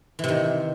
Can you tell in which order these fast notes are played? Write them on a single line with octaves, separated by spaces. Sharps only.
E3 C3 D#3